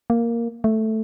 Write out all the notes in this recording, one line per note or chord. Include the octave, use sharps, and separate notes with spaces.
A#3
A3